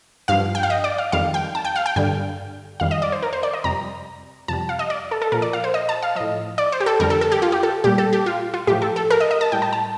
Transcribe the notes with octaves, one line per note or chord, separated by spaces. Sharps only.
G2 F3 F5
G5
F5
D#5
D5
F5
F2 D#3 G3 F5
G5
A5
G5
F5
G5
G2 D3 G3 G5
F2 D#3 G3 F5
D#5
D5
C5
A#4
C5
D5
D#5
F2 C3 G3 A#5
F2 C3 G3 A5
F5
D#5
D5
A4
A4
A#2 F3 A#4
D5
F5
C5
D#5
A5
F5
A2 F3 D#5
D5
C5
G4
A4
F2 D3 G3 A#4
A4
A4
G4
F4
G4
A4
A#2 G3 G4
A4
G4
F4
F4
A2 F3 G4
A4
A4
A#4
D#5
D#5
A5
A2 G3 G5
A5
A5